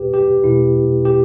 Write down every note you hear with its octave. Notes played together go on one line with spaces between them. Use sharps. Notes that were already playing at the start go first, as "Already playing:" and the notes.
Already playing: E2 B2 A3 G4 B4
G4
E2 B2 A3 E4
G4